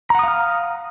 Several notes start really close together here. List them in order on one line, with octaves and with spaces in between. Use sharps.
A#5 F#5 D#6 F5 F6